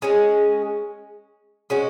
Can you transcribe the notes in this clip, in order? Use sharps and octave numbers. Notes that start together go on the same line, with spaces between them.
G#3 C#4 G#4
G#3 C#4 F#4